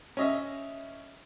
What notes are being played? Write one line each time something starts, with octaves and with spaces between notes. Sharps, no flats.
C#4 D#5 E5